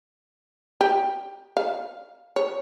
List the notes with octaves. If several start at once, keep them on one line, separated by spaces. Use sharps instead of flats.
G4
F5
C#5